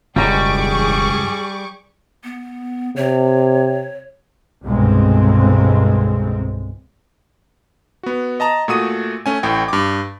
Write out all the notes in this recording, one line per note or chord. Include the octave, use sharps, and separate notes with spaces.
E1 C#2 F#2 G3 G#4 A#5 C#6 D6
B3
C3 C#5
G1 C2 B2 G#3 C4
B3 F#4
D#5 A5 A#5
A#2 A3 F#4 D#6 D#7
A3 C#4 G#5
A1 A2 G5
G2 D6